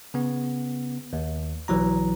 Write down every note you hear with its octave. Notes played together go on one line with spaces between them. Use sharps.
C#3 B3
D#2
B1 E3 F#3 A#5